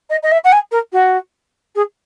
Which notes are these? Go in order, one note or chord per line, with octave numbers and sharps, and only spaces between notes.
D#5
D#5
E5
F#5
G#5
A#4
F#4
G#4